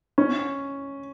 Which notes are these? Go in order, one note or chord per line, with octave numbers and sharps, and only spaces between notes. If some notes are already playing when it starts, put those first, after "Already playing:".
C#4